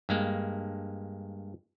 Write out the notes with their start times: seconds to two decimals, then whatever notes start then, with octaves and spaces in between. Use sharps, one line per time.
0.09 G2 G#3 A#3